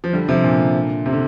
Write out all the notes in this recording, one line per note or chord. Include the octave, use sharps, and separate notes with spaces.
F3
D3 G3
C3 F3
A#2 D3
C3
D3